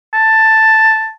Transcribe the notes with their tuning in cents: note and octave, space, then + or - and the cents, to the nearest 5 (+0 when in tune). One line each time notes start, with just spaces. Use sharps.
A5 +5